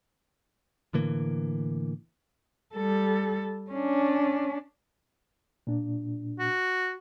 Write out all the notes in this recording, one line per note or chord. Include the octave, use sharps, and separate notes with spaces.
A2 D3 E3 A#3
G3 A4
C#4 D4
A#2 D4
F#4